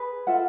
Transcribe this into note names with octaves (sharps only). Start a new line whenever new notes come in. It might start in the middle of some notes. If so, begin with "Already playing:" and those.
Already playing: G#4 B4
F4 A4 E5 F#5